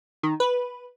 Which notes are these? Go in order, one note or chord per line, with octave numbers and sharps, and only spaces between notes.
D#3
B4